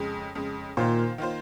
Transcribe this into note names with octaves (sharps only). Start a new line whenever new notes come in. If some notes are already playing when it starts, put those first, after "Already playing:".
Already playing: F2 C#3 G#3
F2 C#3 G#3
A#2 D#3 A#3 F4 C5
D#3 A#3 F4 C5